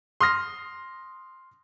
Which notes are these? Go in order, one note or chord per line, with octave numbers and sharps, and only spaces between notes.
C6 D#6 F6 A#6